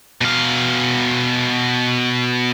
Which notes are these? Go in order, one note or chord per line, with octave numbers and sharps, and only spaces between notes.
B2 F5